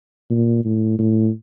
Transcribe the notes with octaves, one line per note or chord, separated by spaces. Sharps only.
A#2
A2
A2